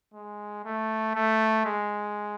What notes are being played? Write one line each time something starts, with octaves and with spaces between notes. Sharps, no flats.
G#3
A3
A3
G#3